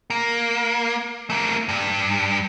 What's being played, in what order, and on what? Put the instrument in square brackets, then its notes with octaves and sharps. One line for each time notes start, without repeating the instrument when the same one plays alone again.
[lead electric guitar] A#3
A3 A#3
G2